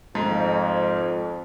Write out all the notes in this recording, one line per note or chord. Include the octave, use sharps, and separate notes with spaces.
F2 G#2